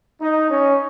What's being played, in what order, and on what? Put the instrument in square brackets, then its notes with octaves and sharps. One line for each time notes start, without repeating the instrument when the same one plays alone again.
[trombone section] D#4
C#4